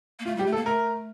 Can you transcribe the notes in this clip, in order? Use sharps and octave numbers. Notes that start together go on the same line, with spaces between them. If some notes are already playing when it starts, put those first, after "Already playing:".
A#3
A3 F4
G3 G4
A3
A4
A#3
A3 A#4